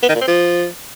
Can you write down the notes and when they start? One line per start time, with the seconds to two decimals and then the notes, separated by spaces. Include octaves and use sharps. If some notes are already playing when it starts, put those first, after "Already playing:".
0.03 B3
0.09 D#3
0.15 A#2
0.21 C4
0.28 F3